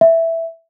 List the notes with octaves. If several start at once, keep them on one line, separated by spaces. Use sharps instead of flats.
E5